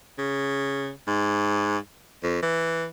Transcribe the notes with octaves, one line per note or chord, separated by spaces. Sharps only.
C#3
G#2
F2
E3